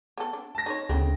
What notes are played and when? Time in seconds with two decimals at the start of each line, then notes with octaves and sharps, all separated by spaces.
0.18 B3 A4
0.33 D4
0.55 A5 A#6
0.66 D#4 B4 C#5
0.89 D2 C#3 B3 C4 E4